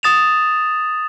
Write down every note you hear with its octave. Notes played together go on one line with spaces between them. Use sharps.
D#6 A6 E7 F7